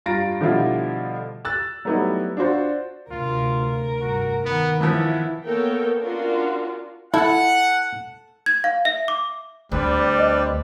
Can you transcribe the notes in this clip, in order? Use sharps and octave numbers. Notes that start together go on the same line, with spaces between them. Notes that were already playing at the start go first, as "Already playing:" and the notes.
G2 F4 A#5 A6 A#6 D7
B2 D3 F3 G3 E4 F4
E6 F#6 A6
F#3 G3 A3 B3 D#4 E4
D4 F4 F#4 C5
D2 C3 F4 A#4
F1 G2 F#4
D#3 B3
E3 F3 B3 E4
A#3 B3 A4 A#4 C#5 G5
C#4 D4 F4 F#4 A#4
E4 A4 F#5 A5
G#6
F5
E5
D6
D2 G3 C4 D4 B4
D#5